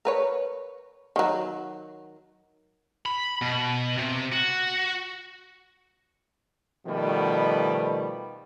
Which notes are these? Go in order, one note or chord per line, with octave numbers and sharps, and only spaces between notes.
A#4 B4 C#5
D#3 F#3
B5
B2
C3
F#4
B2 D#3 F3 G3 A3 B3